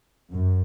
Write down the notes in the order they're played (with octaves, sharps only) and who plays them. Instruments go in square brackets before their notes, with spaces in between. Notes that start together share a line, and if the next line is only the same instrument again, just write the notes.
[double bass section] F#2